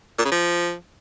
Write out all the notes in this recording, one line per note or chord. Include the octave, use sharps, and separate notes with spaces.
A#2
C#3
F3